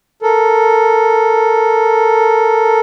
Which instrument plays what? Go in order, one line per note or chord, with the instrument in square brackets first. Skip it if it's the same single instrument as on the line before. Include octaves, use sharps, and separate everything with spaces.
[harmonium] A4 A#4